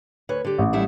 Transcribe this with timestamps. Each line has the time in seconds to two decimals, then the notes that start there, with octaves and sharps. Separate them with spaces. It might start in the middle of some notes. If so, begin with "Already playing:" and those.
0.29 D2 B4 C#5
0.45 D3 G4
0.58 A1
0.73 G3 A3 E4